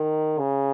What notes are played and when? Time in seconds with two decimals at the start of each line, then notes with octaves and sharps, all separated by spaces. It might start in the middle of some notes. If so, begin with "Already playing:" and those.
Already playing: D#3
0.39 C#3